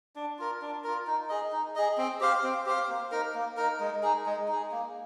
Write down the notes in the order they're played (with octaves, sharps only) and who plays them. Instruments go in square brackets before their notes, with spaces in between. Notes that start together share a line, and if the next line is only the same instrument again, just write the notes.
[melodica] D4
F4 A#4
D4
F4 A#4
D#4
G#4 D#5
D#4
G#4 D#5
C4
G4 C5 F5
C4
G4 C5 F5
A#3
D#4 A#4
A#3
D#4 A#4
G#3
D#4 G#4
G#3
D#4 G#4
A#3